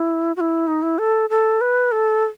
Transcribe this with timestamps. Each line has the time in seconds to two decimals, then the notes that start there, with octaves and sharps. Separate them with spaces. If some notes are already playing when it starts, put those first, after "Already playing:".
Already playing: E4
0.36 F#4
0.41 E4
0.67 D#4
0.83 E4
0.98 A4
1.30 A4
1.61 B4
1.92 A4